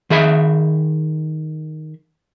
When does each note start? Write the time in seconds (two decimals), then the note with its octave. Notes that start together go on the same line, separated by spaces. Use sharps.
0.10 D#3 G#4 E5 B5